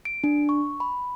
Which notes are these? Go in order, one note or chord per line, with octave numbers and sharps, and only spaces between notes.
D7
D4
C#6
B5